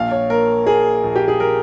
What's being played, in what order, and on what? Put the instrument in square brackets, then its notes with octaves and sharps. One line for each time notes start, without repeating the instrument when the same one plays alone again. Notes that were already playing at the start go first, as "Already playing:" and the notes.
Already playing: [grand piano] A#1 F5
C#5
A#3 A#4
A#3 G#4
A#1
G4
G#4
A#4